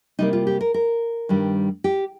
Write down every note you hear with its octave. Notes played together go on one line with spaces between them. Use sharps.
C3 G3 A#3 D#4
F4
G4
A#4
A#4
G2 D#3 G3
G4